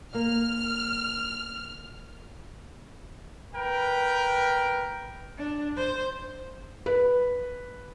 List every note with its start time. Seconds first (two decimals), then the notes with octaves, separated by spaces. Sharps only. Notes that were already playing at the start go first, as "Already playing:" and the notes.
0.14 A#3 F6
3.55 A#4 B4 G5
5.37 D4
5.76 C5
6.86 B4